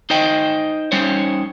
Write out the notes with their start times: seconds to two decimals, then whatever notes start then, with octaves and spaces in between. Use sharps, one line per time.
0.10 D#4 C5 D#5 G5
0.92 G3 C#4 D#4 C5 C#5